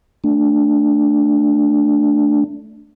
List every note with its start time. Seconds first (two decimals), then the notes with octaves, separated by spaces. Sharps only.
0.24 A3 D4